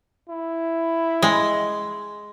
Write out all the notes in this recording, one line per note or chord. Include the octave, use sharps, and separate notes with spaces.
E4
G#3